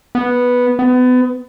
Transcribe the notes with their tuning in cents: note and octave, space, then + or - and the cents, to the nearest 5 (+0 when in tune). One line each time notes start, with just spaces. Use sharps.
B3 -5
B3 +30